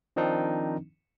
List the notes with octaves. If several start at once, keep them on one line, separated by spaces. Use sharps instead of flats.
D#3 F3 C4 D4 D#4